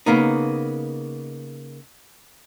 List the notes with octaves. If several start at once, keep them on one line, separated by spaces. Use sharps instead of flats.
C#3 A#3 B3 D#4